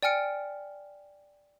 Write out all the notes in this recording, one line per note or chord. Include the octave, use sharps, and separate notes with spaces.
D5 G5 G#5 F6 C#7 D7